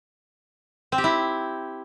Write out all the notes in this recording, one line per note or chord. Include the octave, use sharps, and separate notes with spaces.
C4
G4
E4